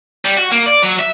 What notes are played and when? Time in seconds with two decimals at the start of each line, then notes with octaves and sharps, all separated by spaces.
0.25 G3
0.37 F#4
0.51 A#3
0.66 D5
0.83 F#3
1.00 E5